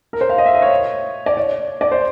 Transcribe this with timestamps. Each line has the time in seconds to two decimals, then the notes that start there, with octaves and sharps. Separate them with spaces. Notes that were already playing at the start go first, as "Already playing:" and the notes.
0.13 A#4
0.21 C5
0.30 F5
0.38 D#5
0.46 E5
0.55 D#5
0.62 C#5
1.26 D5
1.37 C#5
1.81 D5
1.92 C5